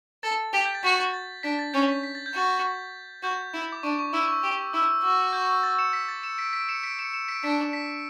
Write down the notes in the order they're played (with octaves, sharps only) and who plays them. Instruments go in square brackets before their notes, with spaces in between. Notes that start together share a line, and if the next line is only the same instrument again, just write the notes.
[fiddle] A4 [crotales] A6
[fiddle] G4 [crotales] B6
[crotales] G6
A6
[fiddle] F#4 [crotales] B6
[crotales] A6
A6
[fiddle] D4 [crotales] B6
[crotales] A6
[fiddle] C#4 [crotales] G6
[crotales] B6
B6
A6
G6
[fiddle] F#4 [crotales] A6
[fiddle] F#4 [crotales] G6
[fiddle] E4
[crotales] D6
[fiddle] D4 [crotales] C#6
[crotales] C#6
[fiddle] E4 [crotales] E6
[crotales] C#6
[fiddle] G4
[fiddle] E4 [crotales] E6
[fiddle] F#4 [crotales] E6
[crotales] G6
A6
C#7 E7
B6
A6
C#7 E7
B6 D7
B6 D7
C#7 E7
B6 D7
C#7 E7
C#7 E7
B6 D7
[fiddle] D4 [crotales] B6
[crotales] B6